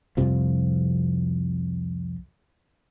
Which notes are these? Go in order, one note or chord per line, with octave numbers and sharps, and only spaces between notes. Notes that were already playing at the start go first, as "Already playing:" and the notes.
C2 F2 C3 F3